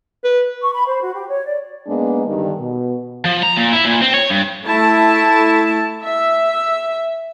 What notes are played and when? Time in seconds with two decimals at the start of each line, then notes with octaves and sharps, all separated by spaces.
0.24 B4
0.62 C#6
0.73 B5
0.86 C5
1.01 F#4
1.14 G4
1.29 C#5
1.46 D5
1.88 G#2 G#3 A#3 B3 D4
2.26 G2 D3 D#3
2.60 B2
3.25 F3
3.43 A#5
3.57 A#2
3.72 E4
3.85 A#2
4.02 C4
4.14 C#5
4.30 G2
4.66 A3 E4 A5
6.04 E5